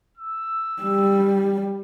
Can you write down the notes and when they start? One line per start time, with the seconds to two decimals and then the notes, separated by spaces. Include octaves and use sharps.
0.17 E6
0.82 G3